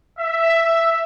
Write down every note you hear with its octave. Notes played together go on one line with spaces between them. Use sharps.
E5